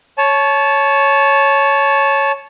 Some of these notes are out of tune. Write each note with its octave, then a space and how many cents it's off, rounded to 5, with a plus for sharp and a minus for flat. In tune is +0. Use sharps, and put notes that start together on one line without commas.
C#5 +0 A5 -20